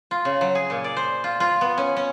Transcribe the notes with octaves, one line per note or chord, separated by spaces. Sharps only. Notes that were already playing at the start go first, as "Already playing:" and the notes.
F4
C#3
F#3
G#4
A#2
D5
C5
F4
F4
B3
C#4
C#4